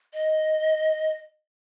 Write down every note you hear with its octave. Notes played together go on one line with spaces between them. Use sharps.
D#5